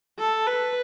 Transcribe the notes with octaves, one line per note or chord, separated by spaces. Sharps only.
A4
B4